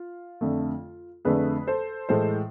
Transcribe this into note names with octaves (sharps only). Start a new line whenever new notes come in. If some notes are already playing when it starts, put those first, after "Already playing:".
Already playing: F4
F2 D3 A3
F2 D3 A3 G#4 B4
A4 C5
A2 E3 G#3 A4 C5